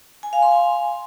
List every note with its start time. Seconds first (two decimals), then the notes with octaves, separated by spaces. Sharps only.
0.23 G#5
0.33 F5
0.42 C6
0.52 G#5